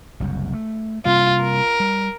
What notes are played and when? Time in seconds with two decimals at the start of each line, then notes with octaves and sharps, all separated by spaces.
0.20 F#1 C2 F#2
0.53 A3
1.06 C3 G3 A#3 F4
1.43 A#4
1.80 G3